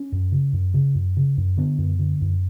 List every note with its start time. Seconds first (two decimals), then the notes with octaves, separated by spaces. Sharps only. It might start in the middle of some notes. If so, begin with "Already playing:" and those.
Already playing: C#4
0.12 F#2
0.32 C#3
0.53 F#2
0.74 C#3
0.95 F#2
1.17 C#3
1.37 F#2
1.57 D3 B3
1.78 F#2
1.99 D3
2.21 F#2